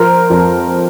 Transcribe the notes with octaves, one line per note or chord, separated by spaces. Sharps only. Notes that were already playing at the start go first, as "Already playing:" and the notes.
Already playing: F3 A#4 C5
F2